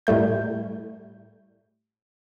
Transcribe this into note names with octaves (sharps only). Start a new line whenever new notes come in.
A2 G3 A3 G6